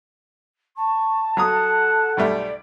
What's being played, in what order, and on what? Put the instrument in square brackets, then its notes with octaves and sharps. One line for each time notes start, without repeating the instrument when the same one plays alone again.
[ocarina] A5 [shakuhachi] C#6
[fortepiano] F#3 A#5 D#6 [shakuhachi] A4 [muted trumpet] F#5
[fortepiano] B1 G3 A3 [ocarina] D5